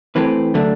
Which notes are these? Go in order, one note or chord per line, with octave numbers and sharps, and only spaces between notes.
E3 A3 C4 G4 B4
D3 F#3 A3 D4